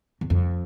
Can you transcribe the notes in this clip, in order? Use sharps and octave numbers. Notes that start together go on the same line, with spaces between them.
E2
F2